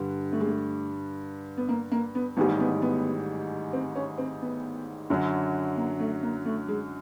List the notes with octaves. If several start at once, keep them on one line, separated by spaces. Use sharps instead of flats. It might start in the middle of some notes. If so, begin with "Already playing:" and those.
Already playing: G2 D3 G3
A3
G#3
A3
B3
A#3
A#3
B3
A1 G#2 D#3 G3 B3
B3
B3
C4
C#4
C4
B3
F#2 D3 F#3
A#3
A3
A#3
A3
G#3